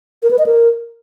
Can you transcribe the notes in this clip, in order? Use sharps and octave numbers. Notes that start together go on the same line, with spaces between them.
A#4
B4
D#5
A#4